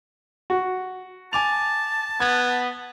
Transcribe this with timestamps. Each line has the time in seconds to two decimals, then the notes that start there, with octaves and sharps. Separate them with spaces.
0.50 F#4
1.33 G#5 A5 D6 F7
2.20 B3 G#6